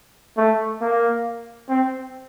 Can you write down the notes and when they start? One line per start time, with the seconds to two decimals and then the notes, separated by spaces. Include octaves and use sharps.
0.37 A3
0.81 A#3
1.69 C4